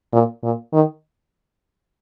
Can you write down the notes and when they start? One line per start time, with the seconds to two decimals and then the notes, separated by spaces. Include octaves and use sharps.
0.13 A#2
0.43 A#2
0.73 D#3